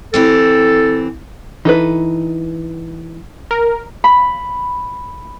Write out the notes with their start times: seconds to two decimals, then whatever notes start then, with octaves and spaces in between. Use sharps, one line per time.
0.14 E3 C4 G4 A4
1.65 E3 D#4 A4 B4
3.51 A#4
4.04 B5